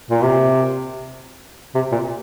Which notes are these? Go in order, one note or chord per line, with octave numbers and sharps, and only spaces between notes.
A#2
C3
C3
A#2